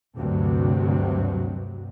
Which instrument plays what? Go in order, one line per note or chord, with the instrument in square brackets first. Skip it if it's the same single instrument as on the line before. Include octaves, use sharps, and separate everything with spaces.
[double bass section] D2 G2 C3 F#3